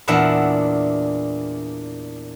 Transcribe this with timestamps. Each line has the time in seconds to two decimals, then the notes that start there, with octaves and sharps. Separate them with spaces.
0.08 E2 A#2 D4 E5 F#5 B5